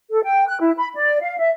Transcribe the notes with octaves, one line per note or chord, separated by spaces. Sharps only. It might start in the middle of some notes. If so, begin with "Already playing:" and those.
A4
G5
F#6
E4
B5
D5
F5
E5